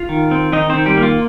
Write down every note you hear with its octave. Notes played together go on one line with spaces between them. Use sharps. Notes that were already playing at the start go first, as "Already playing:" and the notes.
Already playing: F4 F5
D#3
C4
D#3 D#4 D#5
D#3 C4 C5
G3 G4
A#3
F4